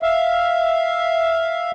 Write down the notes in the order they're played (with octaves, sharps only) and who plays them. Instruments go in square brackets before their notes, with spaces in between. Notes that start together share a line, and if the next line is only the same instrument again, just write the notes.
[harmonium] E5 F5